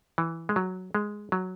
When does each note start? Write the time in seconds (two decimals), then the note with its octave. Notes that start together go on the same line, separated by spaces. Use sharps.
0.18 E3
0.49 G#3
0.56 F#3
0.95 G#3
1.32 F#3